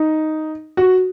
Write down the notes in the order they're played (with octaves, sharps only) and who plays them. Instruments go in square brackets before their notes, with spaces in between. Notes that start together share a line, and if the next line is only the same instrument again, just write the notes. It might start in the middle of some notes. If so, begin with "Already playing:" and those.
Already playing: [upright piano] D#4
F#4